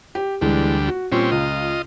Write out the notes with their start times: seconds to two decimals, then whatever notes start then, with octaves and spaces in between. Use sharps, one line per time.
0.15 G4
0.41 D2 E3 G3 G#3
0.88 F#4
1.12 A#2 G3 C4 C#4
1.31 C#2 F4 D#5